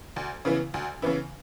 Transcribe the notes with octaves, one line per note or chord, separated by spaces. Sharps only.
D2
C#3 E3 B3 E4
D2
C#3 E3 B3 E4